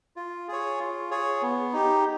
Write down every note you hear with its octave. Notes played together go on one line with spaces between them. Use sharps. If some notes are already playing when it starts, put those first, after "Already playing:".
F4
G#4 C#5
F4
G#4 C#5
B3
D#4 G4